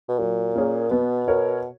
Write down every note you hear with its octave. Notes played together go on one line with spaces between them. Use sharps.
B2
A#2 F#3
A#3 C#4 G#4 C#5
B2 B3
F#4 A#4 C#5